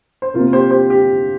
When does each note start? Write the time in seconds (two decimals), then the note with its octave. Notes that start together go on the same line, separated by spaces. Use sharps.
0.22 C5
0.34 C3 A#3 F4 A#4
0.53 G4 C5
0.71 G4 C5
0.90 G4